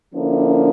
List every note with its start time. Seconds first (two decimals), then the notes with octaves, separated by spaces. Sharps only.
0.13 D3 F3 A#3 C#4 E4